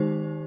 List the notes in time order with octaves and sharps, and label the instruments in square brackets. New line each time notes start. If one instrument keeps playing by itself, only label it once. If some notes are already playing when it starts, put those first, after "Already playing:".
Already playing: [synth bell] D#3 G#3 D#4 G4 C5